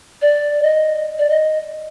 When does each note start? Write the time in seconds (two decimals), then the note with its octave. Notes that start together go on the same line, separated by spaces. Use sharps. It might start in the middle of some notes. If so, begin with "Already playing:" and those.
0.22 D5
0.63 D#5
1.19 D5
1.30 D#5